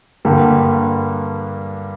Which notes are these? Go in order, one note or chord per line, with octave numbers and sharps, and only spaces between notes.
G2 D3 G3 A#3